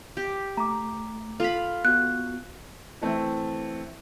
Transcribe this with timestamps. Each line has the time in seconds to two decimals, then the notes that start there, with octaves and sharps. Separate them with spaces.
0.17 G4
0.57 A3 A#5 D6
1.40 F4 A4 B5 F7
1.85 B3 F#4 F#6
3.01 E3 A3 C4